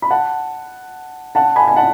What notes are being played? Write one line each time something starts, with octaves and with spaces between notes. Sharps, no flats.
B5
F#5 A5
F#5 A5
G#5 B5
G#5
F#5 A5